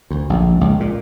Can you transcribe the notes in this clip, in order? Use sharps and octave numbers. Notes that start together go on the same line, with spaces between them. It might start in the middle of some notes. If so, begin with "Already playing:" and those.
D2
A#1
C#2
A#2